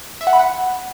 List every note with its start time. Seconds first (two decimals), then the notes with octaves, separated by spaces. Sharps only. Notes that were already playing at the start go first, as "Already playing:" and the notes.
0.21 E5
0.27 F#5
0.33 B5
0.39 F#5